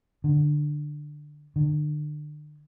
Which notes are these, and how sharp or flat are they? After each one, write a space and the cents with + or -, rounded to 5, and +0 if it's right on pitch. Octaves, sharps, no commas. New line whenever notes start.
D3 +15
D3 +35